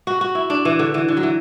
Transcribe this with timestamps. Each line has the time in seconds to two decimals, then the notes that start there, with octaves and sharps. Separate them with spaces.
0.07 F#4
0.21 F#4
0.35 E4
0.50 D4
0.65 E3
0.79 D3
0.94 E3
1.08 D3
1.17 F#3
1.23 E3